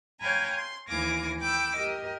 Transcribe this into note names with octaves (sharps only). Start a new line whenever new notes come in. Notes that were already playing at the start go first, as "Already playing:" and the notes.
C#5 F5 G5 G#5 A#5 B5
C6
D#2 E3 F5 G#5 D6 A#6
G5 B5 D6 E6
G4 A#4 D#5